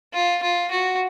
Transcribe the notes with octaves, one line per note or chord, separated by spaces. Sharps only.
F4
F4
F#4